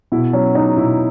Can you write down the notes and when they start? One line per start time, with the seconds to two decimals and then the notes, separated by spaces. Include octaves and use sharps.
0.12 B2 E4
0.33 F#3 C#4
0.55 F#3 D#4
0.77 B2 E4